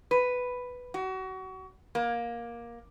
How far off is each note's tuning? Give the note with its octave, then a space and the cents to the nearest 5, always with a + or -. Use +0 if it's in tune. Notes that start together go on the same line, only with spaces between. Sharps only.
B4 +5
F#4 +30
A#3 +15